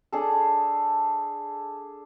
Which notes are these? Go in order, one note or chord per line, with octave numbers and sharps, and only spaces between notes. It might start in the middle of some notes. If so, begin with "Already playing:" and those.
D4 G#4 A4